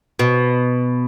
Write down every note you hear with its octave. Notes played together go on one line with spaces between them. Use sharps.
B2